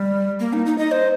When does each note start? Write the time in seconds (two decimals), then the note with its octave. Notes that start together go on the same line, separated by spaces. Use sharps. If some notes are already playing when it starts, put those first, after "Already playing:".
Already playing: G3
0.40 A#3
0.53 D#4
0.66 D#4
0.78 D#5
0.91 C5